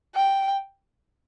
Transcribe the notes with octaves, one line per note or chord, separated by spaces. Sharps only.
G5